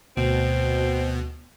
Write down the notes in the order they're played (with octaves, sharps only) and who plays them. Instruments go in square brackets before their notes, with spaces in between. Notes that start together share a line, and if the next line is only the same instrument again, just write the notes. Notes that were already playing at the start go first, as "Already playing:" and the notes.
[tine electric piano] D2 [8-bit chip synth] B2 [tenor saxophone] C4